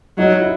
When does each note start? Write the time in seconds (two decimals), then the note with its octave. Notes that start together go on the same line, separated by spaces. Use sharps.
0.18 F#3 D#4
0.41 E4